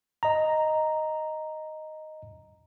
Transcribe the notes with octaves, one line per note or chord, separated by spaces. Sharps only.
D#5 A#5